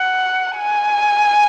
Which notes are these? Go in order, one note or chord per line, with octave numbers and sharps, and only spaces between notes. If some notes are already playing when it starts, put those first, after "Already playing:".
Already playing: F#5
G#5